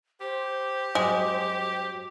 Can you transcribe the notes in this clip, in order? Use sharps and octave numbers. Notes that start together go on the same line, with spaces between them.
G4 C5
F#2 G#3 F#4